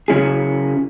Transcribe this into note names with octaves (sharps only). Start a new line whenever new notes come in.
C#3 F#3 C#4 E4 G#4